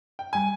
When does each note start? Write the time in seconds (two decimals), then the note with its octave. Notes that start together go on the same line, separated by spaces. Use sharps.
0.19 G5
0.33 G3 G#5